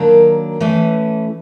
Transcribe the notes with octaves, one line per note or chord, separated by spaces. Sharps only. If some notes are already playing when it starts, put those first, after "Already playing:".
Already playing: D#3 F#3 A#3 D4
E3 A3 C#4